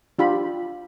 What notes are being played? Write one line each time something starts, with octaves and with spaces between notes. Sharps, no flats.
D4 F4 G4 B5